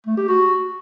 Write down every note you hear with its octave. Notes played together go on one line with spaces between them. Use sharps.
A3
G4
F#4